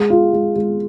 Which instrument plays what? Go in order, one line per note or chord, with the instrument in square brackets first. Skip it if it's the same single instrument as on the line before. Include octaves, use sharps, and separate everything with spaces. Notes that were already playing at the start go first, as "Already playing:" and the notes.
Already playing: [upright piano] G#3
F4
G#3
G#3